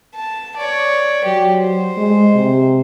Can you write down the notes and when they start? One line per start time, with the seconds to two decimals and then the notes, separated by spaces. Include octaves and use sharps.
0.15 A5
0.57 C#5 D5
1.25 F#3 G4
1.59 C5
1.98 G#3
2.36 C3